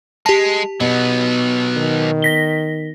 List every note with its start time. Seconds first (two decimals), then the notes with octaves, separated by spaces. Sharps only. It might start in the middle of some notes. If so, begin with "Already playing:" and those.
0.26 G#3 G4 A5
0.80 B2 F#3 B3
1.76 D#3
2.22 A#6 B6 G7